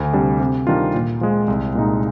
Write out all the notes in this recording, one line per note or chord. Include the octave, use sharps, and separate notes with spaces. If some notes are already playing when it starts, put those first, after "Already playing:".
Already playing: D2
C3 G3 D4
C3
D#3 G3 D4 F4
A#2
F3 G#3
C2
A#2 G#3 D#4